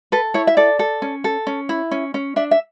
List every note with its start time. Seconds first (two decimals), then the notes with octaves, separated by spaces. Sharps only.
0.12 A4 B4
0.34 E4 C#5
0.47 E5
0.57 A4 D5
0.79 A4
1.02 C#4
1.24 A4
1.47 C#4
1.69 E4
1.91 C#4
2.14 C#4
2.36 D4 E5
2.51 E5